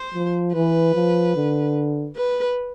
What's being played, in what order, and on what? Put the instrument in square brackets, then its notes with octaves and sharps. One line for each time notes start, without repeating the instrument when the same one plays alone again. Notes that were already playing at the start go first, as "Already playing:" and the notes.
Already playing: [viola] C5
[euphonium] F3
[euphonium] E3 [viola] B4
[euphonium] F3
D3
[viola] B4